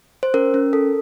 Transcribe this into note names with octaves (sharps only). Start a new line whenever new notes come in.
C5
C#4 A#4
C#4
A4